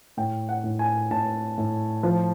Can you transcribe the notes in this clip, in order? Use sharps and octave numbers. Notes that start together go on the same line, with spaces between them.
A2 G5
F#5
A2
G#5
A2 A5
A2
F3